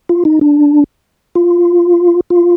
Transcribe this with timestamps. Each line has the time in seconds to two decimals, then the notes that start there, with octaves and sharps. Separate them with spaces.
0.09 F4
0.25 D#4
0.41 D4
1.35 F4
2.30 F4